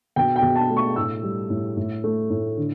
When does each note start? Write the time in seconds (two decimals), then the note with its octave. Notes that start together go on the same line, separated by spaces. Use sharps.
0.16 B2 G5
0.36 G5
0.42 B2
0.56 A5
0.70 A3
0.77 C#6
0.96 A2 E6
1.23 G3
1.50 A2
1.77 A2
2.04 A3
2.30 A2
2.57 D3